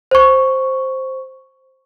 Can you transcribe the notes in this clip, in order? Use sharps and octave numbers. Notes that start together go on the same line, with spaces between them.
C5 C#6